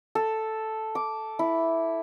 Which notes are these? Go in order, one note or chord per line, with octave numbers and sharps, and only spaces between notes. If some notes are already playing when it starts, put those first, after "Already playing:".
A4
D6
E4